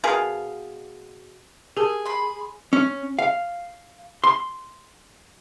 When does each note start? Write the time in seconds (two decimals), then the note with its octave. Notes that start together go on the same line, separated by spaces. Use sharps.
0.04 B2 G#4 A#4 F5
1.77 G4 G#4 A#4 A5
2.05 B5 C6
2.73 C#4
3.19 F5
4.24 C6